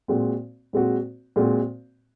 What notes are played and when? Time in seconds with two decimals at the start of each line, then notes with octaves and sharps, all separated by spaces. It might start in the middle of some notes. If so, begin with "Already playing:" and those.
0.08 A#2 G#3 C4 F#4
0.73 A#2 G#3 C4 F#4
1.36 A#2 G#3 C4 F#4